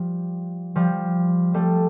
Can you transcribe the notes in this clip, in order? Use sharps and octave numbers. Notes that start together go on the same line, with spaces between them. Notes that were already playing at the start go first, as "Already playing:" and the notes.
Already playing: F3 G3
F3 G3
G3 A3